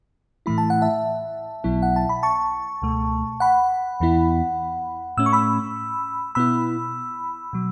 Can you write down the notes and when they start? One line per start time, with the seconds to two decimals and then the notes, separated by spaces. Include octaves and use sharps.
0.46 A2 E3 A3 E4 B5
0.58 A5
0.70 F#5
0.82 E5 A5
1.64 B1 B2 F#3 B3 E4
1.82 F#5
1.96 A5
2.09 B5
2.23 A5 C#6
2.82 C#2 B2 A3
3.40 F#5 B5
4.00 E2 E3 B3 E4
5.17 A2 A3 C#4 E6
5.26 C#6
5.33 B5 E6
6.35 B2 B3 E4 B5 E6
7.53 B2 F#3